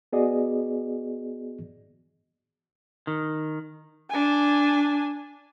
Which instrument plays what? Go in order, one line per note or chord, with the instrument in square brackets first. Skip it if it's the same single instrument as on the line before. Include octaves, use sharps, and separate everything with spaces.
[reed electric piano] B3 F#4 G#4 D5 D#5
[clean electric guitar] D#3
[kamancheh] D4 G#5